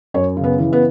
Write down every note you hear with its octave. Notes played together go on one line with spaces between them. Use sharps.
F#2 C#5
C#3
B3
E3
B3